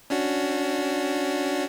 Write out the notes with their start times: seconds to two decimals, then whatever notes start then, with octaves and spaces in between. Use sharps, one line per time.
0.10 C#4 D4 F#4